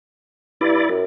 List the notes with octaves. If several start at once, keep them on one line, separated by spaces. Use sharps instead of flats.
G2 E4 D5
F#2